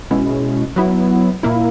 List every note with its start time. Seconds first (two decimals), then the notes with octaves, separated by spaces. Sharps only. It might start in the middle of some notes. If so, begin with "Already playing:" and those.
0.11 B2 G#3 C#4 E4
0.76 F#3 B3 E4
1.43 A#2 A#3 E4